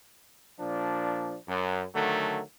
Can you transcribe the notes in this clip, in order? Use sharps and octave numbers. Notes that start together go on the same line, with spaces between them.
A#2 F3 D4
F#2
D3 D#3 F#3 A3